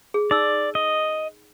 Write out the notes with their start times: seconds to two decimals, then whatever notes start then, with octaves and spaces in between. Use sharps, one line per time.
0.14 G#4
0.31 D#4 D5 E6
0.75 D#5